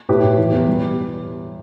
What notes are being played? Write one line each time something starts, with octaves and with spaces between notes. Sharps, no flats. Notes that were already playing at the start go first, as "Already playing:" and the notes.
A2 G4 B4
A2
E3
E2
G3